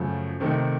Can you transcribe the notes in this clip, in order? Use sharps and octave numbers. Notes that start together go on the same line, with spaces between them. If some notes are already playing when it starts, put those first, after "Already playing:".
Already playing: F#2 C#3 F3 A3
C3 D#3 A3 D#4